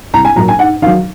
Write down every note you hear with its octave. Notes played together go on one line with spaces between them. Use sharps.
C2 A#5
G#5
A#2 F#3 A#5
G#5
G#2 F#5
D#3 F#3 F5